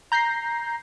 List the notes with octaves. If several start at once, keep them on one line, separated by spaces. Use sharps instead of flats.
A#5 G6 A#6 C7